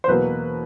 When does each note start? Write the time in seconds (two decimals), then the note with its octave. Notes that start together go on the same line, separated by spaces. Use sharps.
0.04 C5
0.08 E2 B2 F#3 A#3 B4